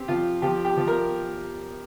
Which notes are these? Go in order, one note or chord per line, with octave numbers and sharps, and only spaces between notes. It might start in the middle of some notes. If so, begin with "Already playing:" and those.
Already playing: C4 G4
F3 F4
F3 G4
G4
F3
A#4